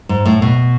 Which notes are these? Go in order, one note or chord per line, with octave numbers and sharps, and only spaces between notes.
G#2
A2
B2